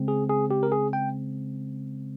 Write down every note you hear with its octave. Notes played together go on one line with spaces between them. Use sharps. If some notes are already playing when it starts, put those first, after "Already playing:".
Already playing: C#3 G#3 C4
G#4
G#4
G4
A#4
G#4
G5